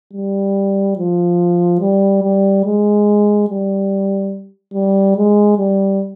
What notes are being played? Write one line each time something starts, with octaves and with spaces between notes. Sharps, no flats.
G3
F3
G3
G3
G#3
G3
G3
G#3
G3